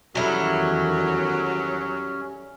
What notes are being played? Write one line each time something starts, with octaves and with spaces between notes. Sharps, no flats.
E2 D#3 F#3 G3 C#4 E4 A4